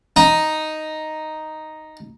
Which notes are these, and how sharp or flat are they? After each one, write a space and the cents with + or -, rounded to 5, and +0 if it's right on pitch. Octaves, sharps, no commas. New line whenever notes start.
D#4 +0